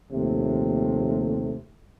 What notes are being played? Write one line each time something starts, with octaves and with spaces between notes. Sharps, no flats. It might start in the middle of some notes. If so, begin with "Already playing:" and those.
A#1 D#2 C3 A3